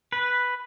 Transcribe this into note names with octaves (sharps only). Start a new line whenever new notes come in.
B4